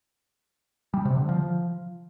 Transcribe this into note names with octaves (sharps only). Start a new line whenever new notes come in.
G3
C3
D3
F3